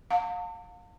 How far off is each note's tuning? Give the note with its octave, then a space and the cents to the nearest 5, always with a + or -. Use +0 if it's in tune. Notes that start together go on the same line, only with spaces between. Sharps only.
F5 +35 A5 +45